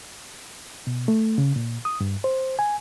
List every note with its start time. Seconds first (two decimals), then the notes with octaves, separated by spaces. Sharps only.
0.87 B2
1.08 A3
1.38 C#3
1.56 A#2
1.85 D#6
2.01 G2
2.24 C5
2.59 G#5